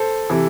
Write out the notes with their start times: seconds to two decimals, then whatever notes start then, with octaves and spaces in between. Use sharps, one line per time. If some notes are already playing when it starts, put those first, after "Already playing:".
Already playing: A4 C5
0.30 C3 E3